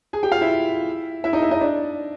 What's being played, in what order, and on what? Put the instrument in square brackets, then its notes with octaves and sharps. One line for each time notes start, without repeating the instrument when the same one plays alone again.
[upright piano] G#4 G#5
G4 G5
F4 F5
E4 E5
E4 E5
D#4 D#5
E4 E5
D#4 D#5
D4 D5